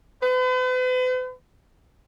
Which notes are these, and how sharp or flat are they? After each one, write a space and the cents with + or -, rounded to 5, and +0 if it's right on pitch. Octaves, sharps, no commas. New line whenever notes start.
B4 +45